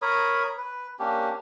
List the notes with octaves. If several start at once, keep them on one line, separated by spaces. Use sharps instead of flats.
A#4 C#5 B5 D#6
B4
A#3 C#4 D4 G4